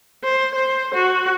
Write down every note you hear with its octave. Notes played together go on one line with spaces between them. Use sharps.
C5
C5
F#4